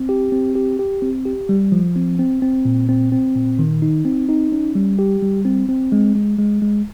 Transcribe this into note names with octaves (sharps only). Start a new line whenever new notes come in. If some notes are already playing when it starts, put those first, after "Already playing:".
Already playing: C4
G4
C4
G4
G4
C4
G4
G3
F3
C4
C4
C4
A#2
C4
C4
A#2
D#3
D#4
C4
D#4
C#4
G3
G4
G3
C4
C4
G#3
G#3
G#3
G#3